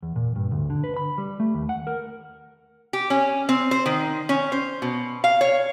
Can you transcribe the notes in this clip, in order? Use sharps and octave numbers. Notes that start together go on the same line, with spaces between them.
E2
A#2
G2
D2
D3
B4
B5
G3
A3
D#2
F#5
A#4
G4
C#4
C4
C5
D#3
C#4
C5
B2
F5
C#5